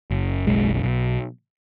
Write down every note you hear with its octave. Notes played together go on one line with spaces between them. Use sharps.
F#1
B1 G#3
B1